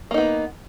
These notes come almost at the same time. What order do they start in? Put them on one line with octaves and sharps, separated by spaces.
A#3 D#4 B3